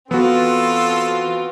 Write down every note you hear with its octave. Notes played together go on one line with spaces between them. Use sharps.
E3 B3 C4 F4 F#4 A4